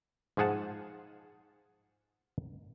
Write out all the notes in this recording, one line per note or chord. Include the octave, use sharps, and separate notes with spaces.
G#2 F3 G#4 F#5 A5